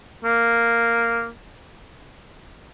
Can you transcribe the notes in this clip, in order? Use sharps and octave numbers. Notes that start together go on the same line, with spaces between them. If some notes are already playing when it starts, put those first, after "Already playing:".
A#3